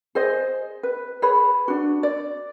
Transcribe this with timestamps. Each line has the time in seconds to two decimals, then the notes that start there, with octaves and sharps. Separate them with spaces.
0.15 G#4 C5 D#5
0.83 B4
1.22 G#4 B4 C#5 B5
1.68 D4 F#4
2.03 D5